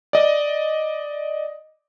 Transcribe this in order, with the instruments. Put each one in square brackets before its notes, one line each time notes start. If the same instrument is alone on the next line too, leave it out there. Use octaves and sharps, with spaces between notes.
[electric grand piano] D5 D#5